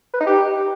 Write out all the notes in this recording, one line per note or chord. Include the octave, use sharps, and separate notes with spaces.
B4
D#4
G4